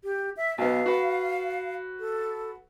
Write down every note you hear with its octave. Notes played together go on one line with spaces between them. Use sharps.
G4
E5
B1 B3 F5
F#4 B4
A4